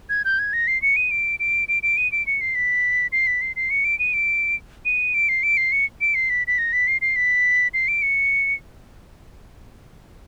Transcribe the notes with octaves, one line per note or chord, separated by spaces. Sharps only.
G#6
G6
G#6
A#6
C7
C#7
D#7
D7
D7
D7
D7
D#7
D7
C#7
C7
B6
C7
B6
C7
C7
C#7
D7
D#7
D7
D#7
D7
C7
D7
C7
C#7
D7
C7
B6
B6
A#6
B6
C7
C7
B6
C7
D7
C#7